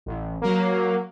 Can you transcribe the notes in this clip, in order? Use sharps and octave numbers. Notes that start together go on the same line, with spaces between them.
A1
F#3 A#3